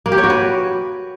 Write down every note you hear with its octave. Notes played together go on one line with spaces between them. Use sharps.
A#3
G4
C#5
F#4
B4